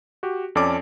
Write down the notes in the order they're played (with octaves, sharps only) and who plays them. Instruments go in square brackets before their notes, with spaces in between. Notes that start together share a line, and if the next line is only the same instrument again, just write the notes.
[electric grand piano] F#4 G4
F2 C#4 A4 D5 A5 D6